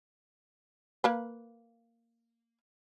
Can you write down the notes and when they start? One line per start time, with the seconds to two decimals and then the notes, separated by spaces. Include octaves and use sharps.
1.04 A#3 B4